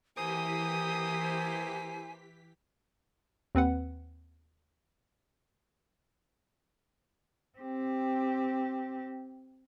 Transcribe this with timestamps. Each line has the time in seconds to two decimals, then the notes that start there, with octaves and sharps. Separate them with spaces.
0.17 E3 A#3 E4 G4 C5 G#5 D#6 B6
3.55 D#2 C4 B4 F#5
7.59 C4 G4